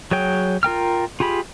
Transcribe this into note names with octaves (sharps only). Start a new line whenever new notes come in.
F#3 G#4 C#5 G5
F4 A#4 G5 F6
F4 G4 G#4 B5